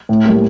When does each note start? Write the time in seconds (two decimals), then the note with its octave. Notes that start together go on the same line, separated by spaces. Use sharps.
0.09 A2
0.25 G3 A#3